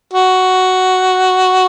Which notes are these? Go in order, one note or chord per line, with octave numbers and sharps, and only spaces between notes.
F#4